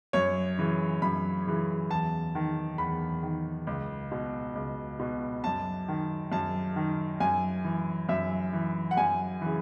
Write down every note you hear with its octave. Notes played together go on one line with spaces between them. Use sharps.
F#2 C#5
C#3 E3
F#2 B5
C#3 E3
E2 A5
D#3
E2 B5
D#3
C#2
B2
C#2
B2
F#2 A5
D#3
F#2 A5
D#3
F#2 G#5
E3
F#2 E5
E3
F#5
F#2 G#5
C#3 E3